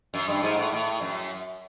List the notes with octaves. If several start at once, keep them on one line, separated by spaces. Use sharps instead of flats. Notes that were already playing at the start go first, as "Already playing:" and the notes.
F#2
G2
G#2
A2
A2
F#2